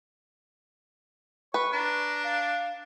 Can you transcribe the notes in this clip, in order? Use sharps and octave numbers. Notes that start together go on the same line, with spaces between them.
B4 C#6
D4 A#5
F5